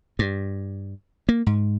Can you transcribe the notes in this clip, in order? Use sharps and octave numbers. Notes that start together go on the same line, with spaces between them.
G2
A#3
G#2